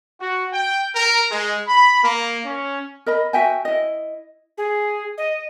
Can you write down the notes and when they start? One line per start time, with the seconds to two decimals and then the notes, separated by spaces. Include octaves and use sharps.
0.20 F#4
0.53 G5
0.94 A#4
1.31 G#3
1.67 B5
2.03 A#3
2.44 C#4
3.06 A#4 D#5 B5
3.33 F#4 E5 G5 G#5
3.65 E4 D#5
4.57 G#4
5.18 D#5